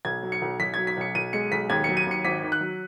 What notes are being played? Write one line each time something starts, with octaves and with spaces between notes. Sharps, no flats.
B1 G#6
F#3
C#7
B1
B1 B6
G#6
F#3
B6
B1 C#7
B1 D#7
G#3 C#7
B1 B6
D#2 G#6
C#7
F#3
D#7
D#2 C#7
G#1 B6
D#3
F#6
F#3